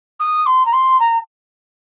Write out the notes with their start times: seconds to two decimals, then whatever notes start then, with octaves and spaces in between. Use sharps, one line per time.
0.20 D#6
0.46 C6
0.65 A#5
0.72 C6
0.99 A#5